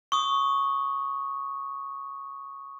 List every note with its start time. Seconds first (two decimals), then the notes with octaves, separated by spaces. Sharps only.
0.12 C#6 D#6